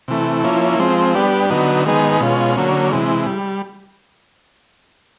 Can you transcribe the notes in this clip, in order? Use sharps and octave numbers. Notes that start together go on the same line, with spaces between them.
C3 E3 A3
F3 A#3 C#4 E4
F3 G#3 C4
G3 B3 D4 G4
D3 F#3 B3 D#4
D#3 G#3 B3 D#4 G#4
B2 G#3 C#4 F4
D3 F#3 A#3 C#4
C3 E3 G#3
G3